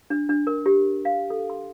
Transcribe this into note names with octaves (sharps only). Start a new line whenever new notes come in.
D4
D4
A#4
G4
F5
A4
C6